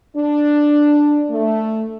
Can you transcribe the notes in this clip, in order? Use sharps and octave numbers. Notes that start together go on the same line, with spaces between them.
D4
A3